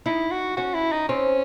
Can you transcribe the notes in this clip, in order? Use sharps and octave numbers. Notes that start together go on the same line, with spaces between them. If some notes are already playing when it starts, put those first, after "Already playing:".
D#4 E4
F#4
C#4 F#4
E4
D#4
C4 C#4